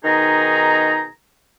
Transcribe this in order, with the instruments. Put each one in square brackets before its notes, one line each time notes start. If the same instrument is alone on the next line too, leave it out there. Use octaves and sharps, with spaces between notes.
[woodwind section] B2 D#3 D#4 G#4 A#5